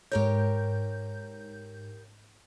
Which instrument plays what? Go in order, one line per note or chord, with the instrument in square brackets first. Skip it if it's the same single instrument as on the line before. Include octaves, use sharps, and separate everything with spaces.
[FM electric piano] G#2 G6 [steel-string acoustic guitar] G4 A#4 C#5